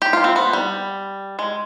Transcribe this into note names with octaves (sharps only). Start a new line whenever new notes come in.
G4
F4
C4
B3
G3
G#3